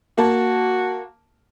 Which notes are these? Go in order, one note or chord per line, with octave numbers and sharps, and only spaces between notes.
A#3 F#4 A5